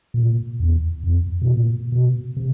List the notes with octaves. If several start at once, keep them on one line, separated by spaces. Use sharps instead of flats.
A#2
E2
F2
B2
A#2
B2
C3